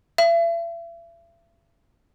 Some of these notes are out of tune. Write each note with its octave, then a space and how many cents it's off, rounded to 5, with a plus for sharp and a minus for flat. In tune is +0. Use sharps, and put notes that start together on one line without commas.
E5 +40